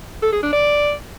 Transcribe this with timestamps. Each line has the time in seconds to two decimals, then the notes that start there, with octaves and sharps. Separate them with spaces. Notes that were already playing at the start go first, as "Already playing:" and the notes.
0.22 A4
0.32 G#4
0.43 D4
0.53 D5